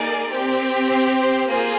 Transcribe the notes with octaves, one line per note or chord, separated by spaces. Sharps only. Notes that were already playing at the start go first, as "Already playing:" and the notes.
Already playing: A#3 D#4 G#4 A#4 D5
C4 G4
C5
C5
A#3 F4 G#4 C5